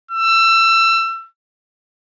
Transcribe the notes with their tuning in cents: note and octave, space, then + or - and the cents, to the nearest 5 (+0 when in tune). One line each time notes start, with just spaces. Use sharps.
E6 +25